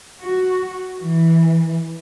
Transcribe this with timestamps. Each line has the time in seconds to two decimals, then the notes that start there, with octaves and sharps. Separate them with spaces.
0.23 F#4
0.98 E3